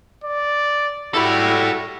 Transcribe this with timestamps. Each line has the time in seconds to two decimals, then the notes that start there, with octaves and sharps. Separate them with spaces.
0.24 D5
1.14 G3 E4 F#4 A4 B5